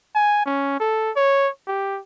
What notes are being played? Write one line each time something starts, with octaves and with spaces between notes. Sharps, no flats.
G#5
C#4
A4
C#5
G4